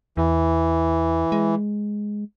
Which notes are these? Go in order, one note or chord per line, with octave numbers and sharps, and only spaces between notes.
E2 E3
G#3